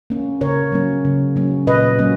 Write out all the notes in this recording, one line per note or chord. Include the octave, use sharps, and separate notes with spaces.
A#3 C#4
C#3 A#4 C#5
F#3 A#3 C#4
C#3
F#3 A#3 C#4
A#2 B4 D#5
F#3 A#3 C#4